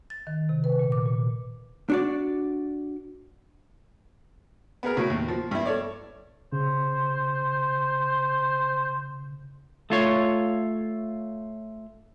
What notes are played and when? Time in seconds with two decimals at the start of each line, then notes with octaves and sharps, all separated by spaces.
0.10 A6
0.27 D#3
0.49 C3
0.64 B4
0.79 A#2
0.92 D6
1.06 A#2
1.90 D4 F#4 D5
4.83 B3 G#4 A#4
4.97 A2 F#3
5.10 D#2
5.28 F3
5.51 G2 E4
5.66 A4 C#5 D5
6.52 C#3 C5
9.90 A3 F4 C#5